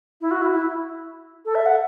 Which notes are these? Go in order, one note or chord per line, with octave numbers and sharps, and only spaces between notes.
E4
F#4
E4
E4
A4
E5
F#5